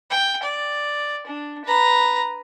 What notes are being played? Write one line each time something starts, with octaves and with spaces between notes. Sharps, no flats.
G5
D5
D4
B4 A#5